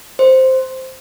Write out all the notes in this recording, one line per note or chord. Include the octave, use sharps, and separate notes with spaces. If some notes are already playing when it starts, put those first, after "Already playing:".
C5